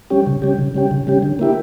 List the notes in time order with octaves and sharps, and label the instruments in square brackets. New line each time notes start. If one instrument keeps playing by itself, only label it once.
[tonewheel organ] G3 C#4 G4
C#3
G3 C#4 G4
C#3
G3 C#4 G4
C#3
G3 C#4 G4
D3
A#3 E4 G4